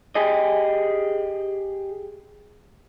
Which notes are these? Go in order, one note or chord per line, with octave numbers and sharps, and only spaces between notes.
G4 G#4 D#5